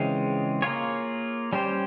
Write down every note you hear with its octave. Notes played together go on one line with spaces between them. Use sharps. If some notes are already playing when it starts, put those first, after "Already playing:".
Already playing: C#3 E3 G#3 C4 F4
A#3 F4 G#4 C#5
G3 C#4 G4 C5